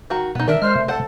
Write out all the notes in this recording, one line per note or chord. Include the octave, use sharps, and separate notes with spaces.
D#3 F#4 A#5
B2 B3 D#4
D#3 D4 A#4 E5
G#3 C5 F6
C3 A3
A4 C5 F#5